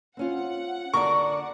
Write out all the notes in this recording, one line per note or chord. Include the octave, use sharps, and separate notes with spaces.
C4 C#4 F4 F#5
D3 A#4 D5 C#6